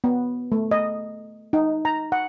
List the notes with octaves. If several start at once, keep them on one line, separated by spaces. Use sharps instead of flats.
B3
A3
D#5
D#4
A#5
F#5